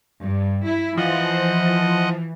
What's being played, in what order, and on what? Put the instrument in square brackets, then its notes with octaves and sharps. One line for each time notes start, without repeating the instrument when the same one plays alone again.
[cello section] G2
E4
[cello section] E3 [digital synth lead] F3 [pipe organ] D#5 F#5